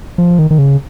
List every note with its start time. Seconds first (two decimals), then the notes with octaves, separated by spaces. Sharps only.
0.18 F3
0.39 D#3
0.51 D#3
0.59 C#3